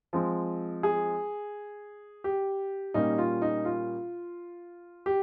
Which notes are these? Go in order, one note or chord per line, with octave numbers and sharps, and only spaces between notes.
F3 G#3 C4
G#4
G4
A#2 G3 A#3 C#4 D#4
F4
D#4
F4
G4